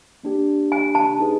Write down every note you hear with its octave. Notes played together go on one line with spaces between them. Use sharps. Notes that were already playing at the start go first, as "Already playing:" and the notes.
A#3 D4 G4
G#5
A5
D#4 G#4 B4